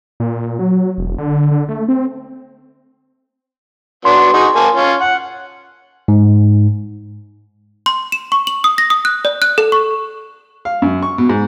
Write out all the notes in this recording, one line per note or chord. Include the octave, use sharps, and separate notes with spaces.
A#2
F#3
E1
D3
D3
A3
C4
F#3 B3 D4 C6
D#4 F#4 G#4
A#3 G#5 A5
C#4 F4
F#5
G#2
C6
E7
C#6
F#7
D#6
A#6
D#6
F#6
D5
F#6
A4
C#6
F5
F#2
C#6
B2
G#2